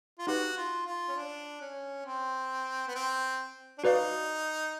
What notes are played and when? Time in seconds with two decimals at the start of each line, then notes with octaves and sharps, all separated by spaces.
0.19 F4
0.27 D#4 F#4 G4 B4
0.57 F4
0.86 F4
1.08 C#4
1.16 D4
1.60 C#4
2.06 C4
2.87 B3
2.95 C4
3.78 D4
3.84 D#4 F#4 B4 D5 F5